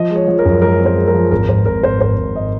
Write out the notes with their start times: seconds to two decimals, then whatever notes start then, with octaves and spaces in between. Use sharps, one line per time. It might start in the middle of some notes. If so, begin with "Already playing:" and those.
Already playing: F3 D#5
0.10 G#3
0.16 C#5
0.28 F3
0.39 A#4
0.45 F#2
0.62 G#3 A#4
0.79 C4
0.85 C5
0.96 G#3
1.08 A#4
1.14 F3
1.31 G#1 A#4
1.48 G#1 C5
1.65 G#1 A#4
1.83 G#1 C5
2.00 G#1 C5
2.17 G#1
2.36 D#5